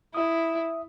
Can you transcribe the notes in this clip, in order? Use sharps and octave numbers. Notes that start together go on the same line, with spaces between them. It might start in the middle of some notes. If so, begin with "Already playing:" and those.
E4 E5 D#6